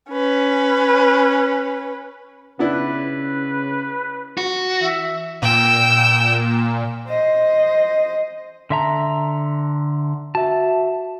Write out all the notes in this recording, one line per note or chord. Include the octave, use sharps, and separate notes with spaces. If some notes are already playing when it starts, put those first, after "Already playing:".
C#4 B4
C#3 B3 D4 E4 B4
F#4
E3 E5
A#2 G5 E6
C5 D#5
D3 E5 A5 A#5 C6
F#4 E5 A5